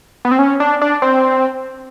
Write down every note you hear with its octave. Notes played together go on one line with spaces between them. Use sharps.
B3
C4
C#4
D4
D4
C4